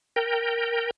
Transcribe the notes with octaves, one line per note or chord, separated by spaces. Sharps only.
A#4 G5